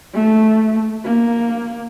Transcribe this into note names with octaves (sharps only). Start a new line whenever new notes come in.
A3
A#3